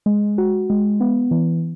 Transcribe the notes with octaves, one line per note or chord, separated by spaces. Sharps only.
G#3
F#4
G#3
B3
E3